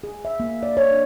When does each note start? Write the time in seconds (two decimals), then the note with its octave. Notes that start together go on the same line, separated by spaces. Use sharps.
0.04 G#4
0.25 E5
0.40 A#3
0.63 D5
0.77 C#5
0.91 D4